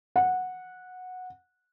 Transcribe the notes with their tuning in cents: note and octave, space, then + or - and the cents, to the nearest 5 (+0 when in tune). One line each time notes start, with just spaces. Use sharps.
F#5 -10